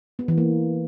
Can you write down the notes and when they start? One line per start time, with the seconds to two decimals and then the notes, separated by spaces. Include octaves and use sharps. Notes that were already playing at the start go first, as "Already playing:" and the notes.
0.19 B3
0.28 E3
0.38 A#3